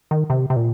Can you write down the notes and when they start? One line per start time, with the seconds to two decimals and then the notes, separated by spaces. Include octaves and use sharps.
0.11 D#3
0.30 C3
0.50 C3
0.56 A#2